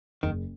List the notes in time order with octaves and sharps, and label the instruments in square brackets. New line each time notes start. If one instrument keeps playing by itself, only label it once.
[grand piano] F#1 [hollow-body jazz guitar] D#3